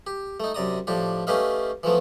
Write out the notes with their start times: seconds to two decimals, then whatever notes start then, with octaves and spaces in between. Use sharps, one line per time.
0.07 G4
0.40 A3 D#4
0.54 F#2 C3 D5 A#5 D#6
0.87 A2 F3 D4 G4
1.27 A3 C#4 G4 B4 D#5 F5
1.83 E3 F3 A3 B3